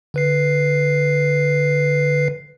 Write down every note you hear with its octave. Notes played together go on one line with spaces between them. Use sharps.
D3 B4 C7